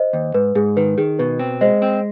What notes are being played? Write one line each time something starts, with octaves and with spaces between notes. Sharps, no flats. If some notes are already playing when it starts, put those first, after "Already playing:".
Already playing: C5 D#5
D#2
G#2 B4
G#2 G#4
D#3 B4
D#3 G#4
B2 B4
C4
G#3 C5 D#5
C4